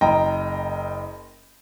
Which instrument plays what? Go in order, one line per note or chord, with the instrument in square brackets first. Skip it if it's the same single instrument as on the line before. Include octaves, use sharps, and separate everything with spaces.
[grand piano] F#1 D#5 G5 A#5